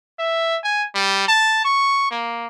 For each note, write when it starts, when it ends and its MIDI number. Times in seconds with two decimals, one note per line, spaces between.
0.19 0.58 76
0.64 0.85 80
0.94 1.27 55
1.28 1.62 81
1.65 2.09 85
2.11 2.47 58